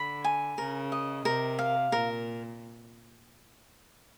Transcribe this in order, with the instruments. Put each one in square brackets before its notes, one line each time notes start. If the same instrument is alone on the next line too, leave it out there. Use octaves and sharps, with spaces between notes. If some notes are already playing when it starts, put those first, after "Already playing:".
Already playing: [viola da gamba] D3 [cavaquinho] B5
[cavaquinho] G#5
[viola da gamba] C#3 [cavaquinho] A#4
[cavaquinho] D#5
[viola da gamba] C3 [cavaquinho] A#4
[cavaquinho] F5
[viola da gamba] A#2 [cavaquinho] A#4